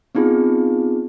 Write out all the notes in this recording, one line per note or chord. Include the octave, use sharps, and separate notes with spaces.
B3 C4 D#4 F4 G#4